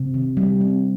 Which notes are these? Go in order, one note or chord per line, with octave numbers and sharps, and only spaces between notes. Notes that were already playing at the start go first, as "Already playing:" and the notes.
Already playing: C3
D#3
G3
C4